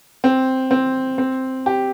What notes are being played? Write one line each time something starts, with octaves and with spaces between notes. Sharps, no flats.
C4
C4
C4
G4